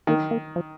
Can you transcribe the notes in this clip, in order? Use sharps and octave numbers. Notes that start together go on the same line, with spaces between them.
D#3 A#3
A#3
F3